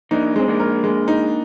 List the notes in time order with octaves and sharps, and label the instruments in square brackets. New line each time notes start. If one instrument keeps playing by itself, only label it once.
[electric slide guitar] A#3 D4 [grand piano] D#4
[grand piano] G#3 [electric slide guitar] C4
[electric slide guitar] A#3 D4
[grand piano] A#4
G#3
D#4